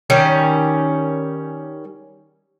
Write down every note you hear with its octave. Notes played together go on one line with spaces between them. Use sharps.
D#3 G3 C#4